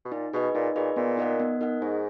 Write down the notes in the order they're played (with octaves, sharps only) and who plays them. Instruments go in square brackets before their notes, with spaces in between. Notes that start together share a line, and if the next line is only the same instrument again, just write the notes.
[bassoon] B2
[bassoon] A#2 [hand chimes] D#4
[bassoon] B2 [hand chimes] G#4 B4 D#5
[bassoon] A#2 [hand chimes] D#4
[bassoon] A#2 [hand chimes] G#4 B4 D#5
[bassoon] A#2 [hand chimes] B3
[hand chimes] D#4 A#4 D#5 F#5
B3
D#4 A#4 D#5 F#5
[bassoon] G#2 [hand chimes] G#4